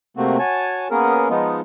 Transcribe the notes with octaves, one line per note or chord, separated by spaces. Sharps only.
C3 A3 A#3 C4 F#4
F#4 C#5 G#5 A5
A#3 B3 C#4 G#4 A#4
F3 G#3 B3 D#4 F4